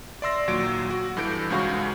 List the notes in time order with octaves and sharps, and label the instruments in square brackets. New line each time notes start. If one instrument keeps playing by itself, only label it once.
[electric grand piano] D5 E5 C6 E6 A#6
D#2 A#2 F#3 D7
F#4
G2 E3 A4 G6 D7
C#2 G#2 C#3 F#4 F5 C#6